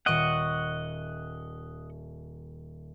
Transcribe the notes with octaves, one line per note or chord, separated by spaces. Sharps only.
D#1 D#5 F#5 C#6 D7